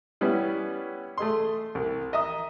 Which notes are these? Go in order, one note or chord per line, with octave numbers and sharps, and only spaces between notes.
G3 B3 C#4 E4
A3 G#4 D#5 C6
C2
D#5 E5 A#5 D#6